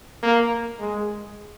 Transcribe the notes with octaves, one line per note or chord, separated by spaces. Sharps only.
A#3
G#3